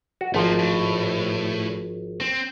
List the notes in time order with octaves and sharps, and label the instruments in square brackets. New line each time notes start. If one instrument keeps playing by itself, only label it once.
[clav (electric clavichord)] F#4
[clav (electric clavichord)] G#1 F3 [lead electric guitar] A3 A#3
[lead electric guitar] A2
C4